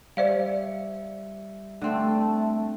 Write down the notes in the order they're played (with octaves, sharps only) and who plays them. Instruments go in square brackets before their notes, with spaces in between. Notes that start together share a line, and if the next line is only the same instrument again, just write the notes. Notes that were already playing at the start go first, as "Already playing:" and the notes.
[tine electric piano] G3 E5 C#7 [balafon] C5 D5 F5
[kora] D3 C4 [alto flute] A3